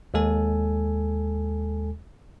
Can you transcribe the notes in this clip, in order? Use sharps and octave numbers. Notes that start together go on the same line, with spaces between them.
D#2 G#3 A4 G#5